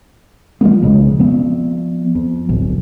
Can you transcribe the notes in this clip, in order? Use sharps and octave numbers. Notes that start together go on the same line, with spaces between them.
F3 G#3 A#3 B3
B1 F2 C#3 G#3
F3 B3 C4
F2
D1 B1